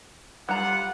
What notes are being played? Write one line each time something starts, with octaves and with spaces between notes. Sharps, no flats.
G3 F4 F#5 A#5